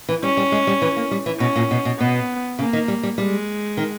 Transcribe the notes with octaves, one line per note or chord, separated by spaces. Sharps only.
E3
G3 C#4
G3
G#3
G3
E3
A#3
G3
E3
B2 C#4
A#2
B2
B2
B2 B3
C#3 A#3
D#3
G3
G3
G3 G#3
D#3